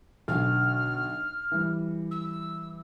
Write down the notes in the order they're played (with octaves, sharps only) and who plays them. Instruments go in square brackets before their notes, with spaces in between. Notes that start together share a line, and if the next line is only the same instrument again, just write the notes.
[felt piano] B1 D3 [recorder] F6
[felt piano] E3 G3
[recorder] E6